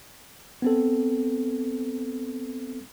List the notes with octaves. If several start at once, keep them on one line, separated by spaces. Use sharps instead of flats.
B3 C4 A4